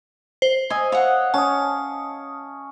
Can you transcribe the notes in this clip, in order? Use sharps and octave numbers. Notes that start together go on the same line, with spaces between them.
C5
D#5 E5 G#5
C#5 F5 F#5
C#4 A5 D#6